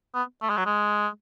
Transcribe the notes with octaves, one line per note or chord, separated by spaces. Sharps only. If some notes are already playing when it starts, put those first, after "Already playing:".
B3
A3
G#3
F#3
G#3